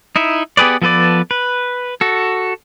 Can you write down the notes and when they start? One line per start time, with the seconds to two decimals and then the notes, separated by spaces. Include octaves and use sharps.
0.16 D#4 E4 E5
0.57 B3 G4 G#4 B4 D5
0.82 F3 B3 A4 B4 D5
1.31 B4
2.01 F#4 A4